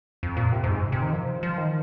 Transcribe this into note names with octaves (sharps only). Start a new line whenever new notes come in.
F2
A#2
C3
F2
G#2
C3
D#3
F3
F3
D#3